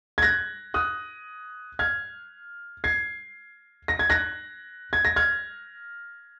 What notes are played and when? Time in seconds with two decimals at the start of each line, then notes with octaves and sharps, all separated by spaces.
0.18 G#6
0.22 F#6 A#6
0.74 D#6 F#6
1.79 F6 G#6
2.84 G#6 C7
3.88 A#6
3.99 G#6
4.10 F#6 A#6
4.93 G#6
5.05 A#6
5.16 F6 G#6